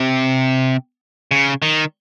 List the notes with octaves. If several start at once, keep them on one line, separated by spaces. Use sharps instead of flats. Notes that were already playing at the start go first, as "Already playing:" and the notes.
Already playing: C3
C#3
D#3